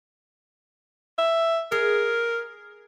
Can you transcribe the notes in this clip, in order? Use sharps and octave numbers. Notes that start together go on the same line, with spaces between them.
E5
G#4 A#4